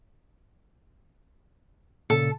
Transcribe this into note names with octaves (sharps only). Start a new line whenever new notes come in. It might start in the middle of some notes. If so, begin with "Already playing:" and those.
A#2 C#3 A4